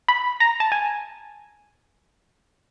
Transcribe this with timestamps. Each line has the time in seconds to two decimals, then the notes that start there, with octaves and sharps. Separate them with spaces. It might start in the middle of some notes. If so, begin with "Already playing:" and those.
0.08 B5
0.40 A#5
0.60 A5
0.72 G#5